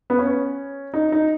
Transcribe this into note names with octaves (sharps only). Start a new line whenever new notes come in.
B3
C#4
D#4
D#4